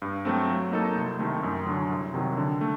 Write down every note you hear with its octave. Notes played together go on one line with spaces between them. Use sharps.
G2
F#3 A3 C4
F#3
A#3 D#4 A4
C2
C3 D#3 A3
F#2
D3 F#3
C2
C3 D#3 F#3
D3
A3